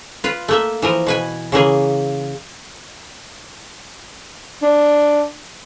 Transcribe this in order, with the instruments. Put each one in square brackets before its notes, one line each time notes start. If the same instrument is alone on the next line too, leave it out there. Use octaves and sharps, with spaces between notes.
[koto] F4 B4
A3 A#3 E5
E3 F3 A#4
B2 B4 G#5
C#3 E3 A#3 G#4
[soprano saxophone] D4